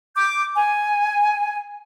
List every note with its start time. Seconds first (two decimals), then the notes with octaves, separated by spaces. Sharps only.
0.16 D6 G6
0.56 G#5